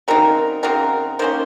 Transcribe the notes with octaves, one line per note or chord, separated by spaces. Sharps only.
C#3 F#3 C4 D#4 A#4
C#3 F#3 C4 D#4 A#4
D#3 A#3 C#4 C5